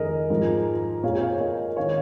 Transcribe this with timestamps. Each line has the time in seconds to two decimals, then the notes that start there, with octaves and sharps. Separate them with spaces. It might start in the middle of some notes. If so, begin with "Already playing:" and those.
Already playing: F2 D#3 G#3 G#4 A#4 D#5
0.30 G#2 F3 G#3
1.03 A#2 G#3 C#5 F5
1.21 C#5 F5
1.40 A#4 D#5
1.77 D#3 G#3 C#5 F5